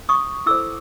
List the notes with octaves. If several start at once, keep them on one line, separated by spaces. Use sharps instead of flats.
C#6 D#6
E4 A4 C5 D6 E6